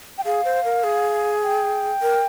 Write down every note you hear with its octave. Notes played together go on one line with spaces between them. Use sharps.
G5
G#4 F5
C5
A#4
G#4
G5
A#4